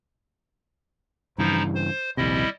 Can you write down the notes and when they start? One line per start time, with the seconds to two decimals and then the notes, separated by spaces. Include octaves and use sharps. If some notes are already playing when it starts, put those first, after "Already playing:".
1.38 G2 C#3 E3 F3 D#4 E4
1.75 C5
2.17 A#1 D#2 C3 G3 E4 D#5